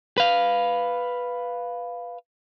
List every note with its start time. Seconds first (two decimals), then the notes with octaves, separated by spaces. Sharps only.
0.18 B4 F5